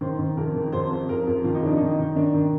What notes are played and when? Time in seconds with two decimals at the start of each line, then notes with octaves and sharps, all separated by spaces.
0.01 D#3 C5
0.19 D#3
0.37 F2 A#4
0.55 D#3
0.72 F2 C5
0.91 F2
1.09 F2 A#4
1.27 F2
1.44 D#3 F4
1.55 D#4
1.63 F2 D4
1.76 D#3 D#4
1.98 D#3
2.16 D#3 D4
2.34 D#3